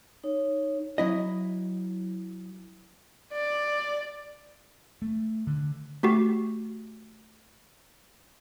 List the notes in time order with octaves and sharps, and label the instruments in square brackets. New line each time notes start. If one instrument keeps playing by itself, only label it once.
[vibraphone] D#4 C#5
[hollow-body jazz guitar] F#3 E4 D#5
[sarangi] D5
[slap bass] A3
D3
[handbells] A3 F#4 G4